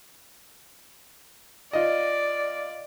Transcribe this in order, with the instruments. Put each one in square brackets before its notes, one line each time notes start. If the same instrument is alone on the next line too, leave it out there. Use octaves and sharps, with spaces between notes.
[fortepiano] F4 D#5 [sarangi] D5